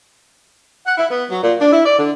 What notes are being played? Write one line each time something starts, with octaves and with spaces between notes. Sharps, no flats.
F#5
E4
B3
F#3
A#2
D4
E4
D5
D3